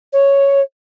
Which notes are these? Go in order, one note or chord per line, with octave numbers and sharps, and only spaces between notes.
C#5